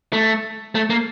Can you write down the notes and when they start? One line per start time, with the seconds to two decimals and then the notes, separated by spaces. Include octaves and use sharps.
0.13 A3
0.75 A3
0.90 A#3